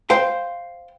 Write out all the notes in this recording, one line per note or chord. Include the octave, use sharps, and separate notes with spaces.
C5 F5 G5